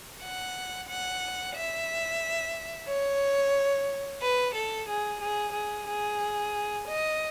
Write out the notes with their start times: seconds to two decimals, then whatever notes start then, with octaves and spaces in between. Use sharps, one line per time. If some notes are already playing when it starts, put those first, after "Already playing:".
0.22 F#5
0.89 F#5
1.56 E5
2.88 C#5
4.21 B4
4.54 A4
4.88 G#4
5.21 G#4
5.54 G#4
5.87 G#4
6.87 D#5